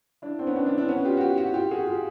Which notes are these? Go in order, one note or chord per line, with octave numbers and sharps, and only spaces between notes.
D4 E4
C4 D4
B3 C#4
C4 D4
D4 E4
C4 D4
B3 C#4
F4 G4
F#4
F4 G4
E4 F#4
F4 G4
F#4 G#4
F4 G4